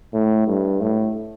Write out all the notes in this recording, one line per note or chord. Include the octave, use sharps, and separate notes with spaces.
A2
G2
A2